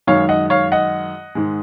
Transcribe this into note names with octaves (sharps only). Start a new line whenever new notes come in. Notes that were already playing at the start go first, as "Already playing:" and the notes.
F#2 D#3 G#3 C#5 F5
D#5 F#5
C#5 F5
D#5 F#5
G#2 D#3 G#3